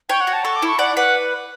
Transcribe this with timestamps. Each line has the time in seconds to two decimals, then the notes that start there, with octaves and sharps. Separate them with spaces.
0.09 C#5 G5
0.21 F#5
0.27 F#4
0.33 A5
0.44 A4 C#6
0.56 D6
0.62 E4 C#6
0.79 D5 F#5
0.96 B4 F#5